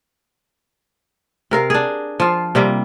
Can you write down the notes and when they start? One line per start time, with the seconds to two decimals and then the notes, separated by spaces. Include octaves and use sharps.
1.51 C3 A#4 F5
1.70 D4 G#4
2.20 F3 F4
2.55 C3 G3 A#3